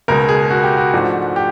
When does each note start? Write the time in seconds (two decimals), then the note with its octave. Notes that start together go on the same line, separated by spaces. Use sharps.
0.08 C#2 B2 G#3 A#4
0.29 G#4
0.50 F#4
0.63 G4
0.77 F#4
0.93 G#2 F3 A3 D4
1.36 G4